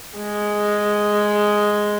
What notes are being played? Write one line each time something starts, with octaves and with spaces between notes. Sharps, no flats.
G#3